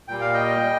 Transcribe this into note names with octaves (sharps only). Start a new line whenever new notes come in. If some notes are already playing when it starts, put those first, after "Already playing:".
A#2 G3 G5
F5
D#5 G5